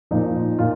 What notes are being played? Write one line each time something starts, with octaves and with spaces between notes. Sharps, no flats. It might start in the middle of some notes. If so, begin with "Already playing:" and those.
A#2 F3 D#4
A#2 F4